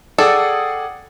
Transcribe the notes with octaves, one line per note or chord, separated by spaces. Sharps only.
G#4 A4 D5 F#5 G5 D#6